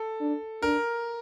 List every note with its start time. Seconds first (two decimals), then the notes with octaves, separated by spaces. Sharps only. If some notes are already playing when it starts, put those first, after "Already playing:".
Already playing: A4
0.21 D4
0.62 D4 A#4